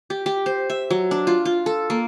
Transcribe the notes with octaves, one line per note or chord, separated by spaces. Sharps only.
G4
G4
C5
E5
F#3
D4
F4
F4
A4
A#3